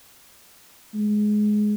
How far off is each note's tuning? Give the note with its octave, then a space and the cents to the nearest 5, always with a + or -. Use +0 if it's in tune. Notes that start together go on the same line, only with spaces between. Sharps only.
G#3 +15